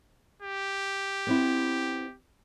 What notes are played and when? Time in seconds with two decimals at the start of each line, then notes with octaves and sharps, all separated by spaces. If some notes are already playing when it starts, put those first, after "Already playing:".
0.42 G4
1.27 B3 C4 E4